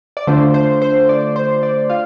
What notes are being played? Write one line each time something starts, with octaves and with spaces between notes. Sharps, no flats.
D5
D3 A3 D4 F4 C5
C5
C5
D5
C5
D5
F4 F5